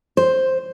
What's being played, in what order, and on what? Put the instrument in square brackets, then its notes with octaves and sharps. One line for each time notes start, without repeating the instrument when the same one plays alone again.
[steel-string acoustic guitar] C5